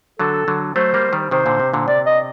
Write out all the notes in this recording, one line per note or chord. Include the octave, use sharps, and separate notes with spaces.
D3 F#3 A4
D3 F#3
F#3 A3 C5
G3 A#3
D#3 G3
C3 D#3 C5
A#2 D3
C3
A#2 D3
C3 D5
D#5